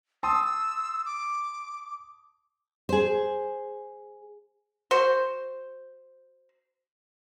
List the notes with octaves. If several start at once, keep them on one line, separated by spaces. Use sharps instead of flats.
A5 C6 D#6 E6
D6
G#4 C5
F#4 C5